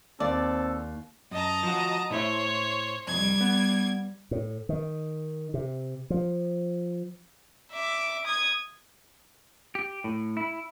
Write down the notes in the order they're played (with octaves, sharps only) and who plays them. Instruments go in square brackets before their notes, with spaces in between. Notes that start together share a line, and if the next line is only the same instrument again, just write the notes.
[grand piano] D#2 [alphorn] C4 [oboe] A4 [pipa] D5
[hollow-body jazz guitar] F#2 [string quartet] D#5 A5 A#5
[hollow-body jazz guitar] F3 F#4
[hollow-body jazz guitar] A2 E4 E5 [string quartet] C5 C#5
[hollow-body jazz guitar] C2 F2 [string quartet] G3 G#6
[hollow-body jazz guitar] B3
[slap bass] A2
D#3
C3
F3
[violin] E5 D6
D#6 G#6
[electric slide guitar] G4
A2
E4